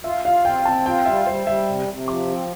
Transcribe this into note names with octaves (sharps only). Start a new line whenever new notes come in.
F4 E5
F4 F5
C4 G5
C4 A5
F4 G5
G3 E5
G3 C5
G3 E5
C3
C3
F3 D6
C4